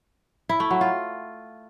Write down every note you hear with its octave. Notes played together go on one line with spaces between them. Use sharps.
E4
A3
F#3
F4